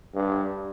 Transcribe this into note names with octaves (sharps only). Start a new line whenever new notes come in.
G2